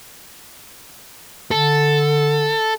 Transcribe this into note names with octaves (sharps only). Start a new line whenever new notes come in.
D3 A4